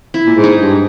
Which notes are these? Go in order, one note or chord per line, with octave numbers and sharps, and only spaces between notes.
E4
A#2
G#2
D#4
G2